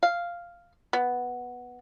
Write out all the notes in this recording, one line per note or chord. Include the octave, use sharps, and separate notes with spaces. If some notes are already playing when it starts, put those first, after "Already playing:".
F5
B3